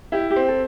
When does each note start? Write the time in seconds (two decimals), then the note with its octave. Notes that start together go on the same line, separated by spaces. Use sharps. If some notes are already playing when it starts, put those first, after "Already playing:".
0.12 E4 G4
0.30 G4
0.36 C4
0.48 A4